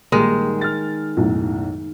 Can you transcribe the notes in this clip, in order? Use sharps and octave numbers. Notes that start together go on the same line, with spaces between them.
A#1 D#3 G3 G#3
F6 A6
B1 F#2 A2